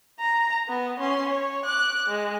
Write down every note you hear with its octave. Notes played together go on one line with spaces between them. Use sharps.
A#5
B3
C#4 C6
C#5
D6 F#6
G#3